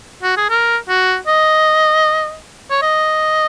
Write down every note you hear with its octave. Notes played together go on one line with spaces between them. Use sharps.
F#4
G#4
A#4
F#4
D#5
C#5
D#5